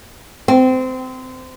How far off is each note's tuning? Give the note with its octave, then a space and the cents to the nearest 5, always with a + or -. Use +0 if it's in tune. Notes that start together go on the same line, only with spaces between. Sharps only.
C4 -25